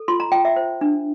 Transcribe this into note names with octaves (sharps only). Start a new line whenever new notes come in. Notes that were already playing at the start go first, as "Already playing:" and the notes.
Already playing: A4
F4 C6
A#5
F4 G5
E5
C5
D4